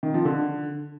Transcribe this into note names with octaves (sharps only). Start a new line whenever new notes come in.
D#3
F3
D3